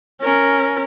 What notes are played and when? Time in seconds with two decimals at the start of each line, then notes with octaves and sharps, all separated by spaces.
0.21 C#4 A#4